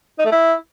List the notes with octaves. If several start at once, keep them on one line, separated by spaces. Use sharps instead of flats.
D#4
A3
E4